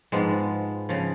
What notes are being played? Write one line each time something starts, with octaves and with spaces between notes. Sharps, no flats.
G#2 F3 G#3 B3
C#3 F3